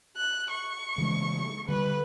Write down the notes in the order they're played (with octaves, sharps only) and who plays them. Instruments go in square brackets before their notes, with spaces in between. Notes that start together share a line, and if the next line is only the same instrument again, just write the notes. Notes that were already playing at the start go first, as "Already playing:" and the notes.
[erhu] F#6
C#6
[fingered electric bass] C#3 E3 G#3
[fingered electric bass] D3 G3 [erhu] B4